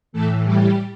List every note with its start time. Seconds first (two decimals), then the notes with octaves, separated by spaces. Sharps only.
0.13 A2 E3 A3 A4
0.44 G3 G4